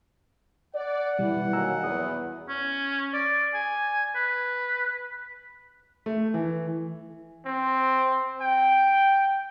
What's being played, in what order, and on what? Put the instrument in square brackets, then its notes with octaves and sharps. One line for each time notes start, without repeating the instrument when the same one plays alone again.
[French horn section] D5 [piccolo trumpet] F#5
[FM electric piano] B2 G3 [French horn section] E3
[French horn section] D#3 F#3 A#3 [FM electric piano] G#5 A#5 E6
[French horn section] E2 [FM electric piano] D#6
[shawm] C#4
D5
G#5
B4
[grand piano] A3
E3
[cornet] C4
G5